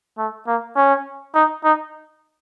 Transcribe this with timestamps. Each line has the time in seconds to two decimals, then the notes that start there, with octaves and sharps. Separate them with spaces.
0.18 A3
0.47 A#3
0.76 C#4
1.35 D#4
1.64 D#4